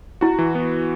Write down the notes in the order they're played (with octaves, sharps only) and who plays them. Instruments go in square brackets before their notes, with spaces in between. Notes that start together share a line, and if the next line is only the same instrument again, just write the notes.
[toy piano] E4 [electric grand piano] F#4
[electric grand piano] E3
B3